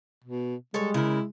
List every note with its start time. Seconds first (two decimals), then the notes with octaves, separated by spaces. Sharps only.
0.24 B2
0.74 G3 G#3 A4 C#5
0.94 C#3 E4 A#4